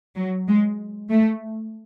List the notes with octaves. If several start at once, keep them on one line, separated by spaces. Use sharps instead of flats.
F#3
G#3
A3